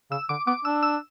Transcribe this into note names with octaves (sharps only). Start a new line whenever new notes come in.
C#3 E6
D3 D6
B3 D6
D4 E6
E6